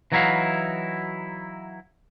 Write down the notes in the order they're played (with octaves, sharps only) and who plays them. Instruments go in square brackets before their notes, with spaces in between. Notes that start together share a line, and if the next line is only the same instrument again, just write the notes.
[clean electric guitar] E3 F#3 D#4 E4 F#4 F5